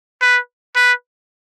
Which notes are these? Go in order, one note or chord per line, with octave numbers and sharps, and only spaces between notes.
B4
B4